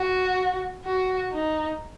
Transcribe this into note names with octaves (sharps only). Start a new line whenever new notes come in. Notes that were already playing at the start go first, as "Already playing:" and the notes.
Already playing: F#4
F#4
D#4